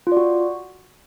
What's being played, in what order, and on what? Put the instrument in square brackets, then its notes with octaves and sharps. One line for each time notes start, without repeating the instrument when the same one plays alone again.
[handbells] F4
D5
F#4